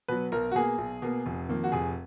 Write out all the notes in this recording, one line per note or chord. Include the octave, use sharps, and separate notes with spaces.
B2 F#3 B4
B1 A#4
F#4
B2 A#3 G#4
B1
B2 A#3
F1
F2 D#3 A#3
F#4
F1 G#4